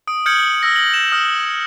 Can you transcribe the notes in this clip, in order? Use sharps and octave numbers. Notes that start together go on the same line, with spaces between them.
D#6 D7
D#6 F6 G6 G#6 C#7 F#7
E6 A#6
F#7
E7
D#6 F6